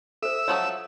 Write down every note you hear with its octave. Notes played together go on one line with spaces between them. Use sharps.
A4 C5 E5
F3 F#3 A4 C#5 D#6